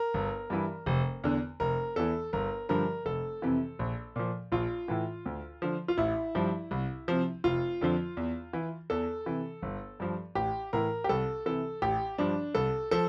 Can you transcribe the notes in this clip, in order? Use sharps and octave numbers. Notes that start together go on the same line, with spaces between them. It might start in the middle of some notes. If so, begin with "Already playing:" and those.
Already playing: A#4
G1
G2 E3
F1
E2 D3
F1 A#4
E2 E3 A4
G1 A#4
G2 D3 F3 A#4
F1 A4
F2 C3 E3
A#1
A#2 F3
A#1 F4
A2 E3
D2
D3 F3
F4
A1 E4
G2 F3
C2
C3 F3
F1 F4
F2 D3 F3
E2
E3
E2 A4
C3 E3
G1
G2 F3
A1 G4
A2 E3 A#4
G4
C2 A4
C3 E3 A4
A1 G4
G2 F3 D4
C2 A4
F3 A4